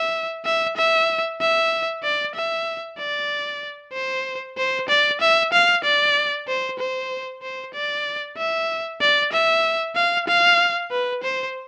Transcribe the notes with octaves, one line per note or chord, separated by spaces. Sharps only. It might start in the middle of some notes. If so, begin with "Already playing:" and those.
Already playing: E5
E5
E5
E5
D5
E5
D5
C5
C5
D5
E5
F5
D5
C5
C5
C5
D5
E5
D5
E5
F5
F5
B4
C5